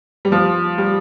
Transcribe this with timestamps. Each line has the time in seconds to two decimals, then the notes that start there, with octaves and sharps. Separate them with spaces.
0.25 G3
0.32 F3
0.78 G3